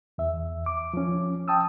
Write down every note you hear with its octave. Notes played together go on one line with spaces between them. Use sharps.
E2 E5
D6
F3 C#4
G5 A5 D#6 E6